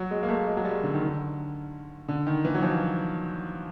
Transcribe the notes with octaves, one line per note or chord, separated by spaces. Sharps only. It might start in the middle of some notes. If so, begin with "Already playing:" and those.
Already playing: F#3
G#3
A#3
A3
G#3
F#3
G3
D3
D#3
D3
D3
D#3
E3
F#3
F3